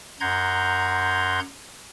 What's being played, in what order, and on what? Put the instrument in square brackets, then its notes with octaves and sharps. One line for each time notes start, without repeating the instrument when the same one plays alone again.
[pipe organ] F#2 F#5 A#5 C6 G6 G#6